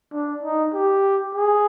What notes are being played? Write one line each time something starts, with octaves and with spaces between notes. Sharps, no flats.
D4
D#4
G4
G#4